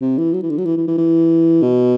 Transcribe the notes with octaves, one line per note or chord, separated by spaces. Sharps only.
C3
E3
F#3
E3
D3
F#3
E3
E3
E3
E3
B2